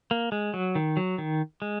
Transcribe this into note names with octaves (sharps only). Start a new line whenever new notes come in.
A#3
G#3
F#3
D#3
F#3
D#3
G#3